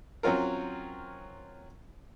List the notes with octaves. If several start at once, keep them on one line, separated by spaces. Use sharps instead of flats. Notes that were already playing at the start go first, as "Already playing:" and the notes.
F#3 C4 C#4 F4 A#4